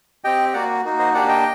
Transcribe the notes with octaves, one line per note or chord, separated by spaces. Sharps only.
C4 G4 D#5 G5
A#3 F#4 D5 F#5
A#3 D#4 F#4
C5 D#5
A#3 D4 G4 D5 F#5
D#5 G5